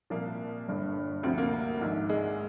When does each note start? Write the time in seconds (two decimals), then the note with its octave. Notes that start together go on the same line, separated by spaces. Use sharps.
0.10 C2 A#2 F3 A#3
0.68 G1 G2 D3
1.23 D2 C3 F3 C4
1.38 A#3
1.81 A#1 G#2 D#3
2.09 G#3